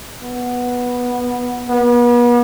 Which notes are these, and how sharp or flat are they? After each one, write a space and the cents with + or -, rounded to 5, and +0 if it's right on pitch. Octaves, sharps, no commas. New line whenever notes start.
B3 -10
B3 -40